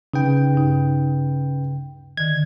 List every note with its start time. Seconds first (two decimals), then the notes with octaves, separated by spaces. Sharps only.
0.14 C#3 D#4 B4 G5
0.54 G2 D#4
2.17 D3 D#3 G#6